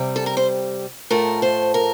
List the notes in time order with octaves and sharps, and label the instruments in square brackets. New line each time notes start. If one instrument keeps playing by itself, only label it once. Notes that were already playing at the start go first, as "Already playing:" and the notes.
Already playing: [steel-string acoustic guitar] C3 G3
A4
A#4
C5
A2 F3 A3 A#4
C5
A#4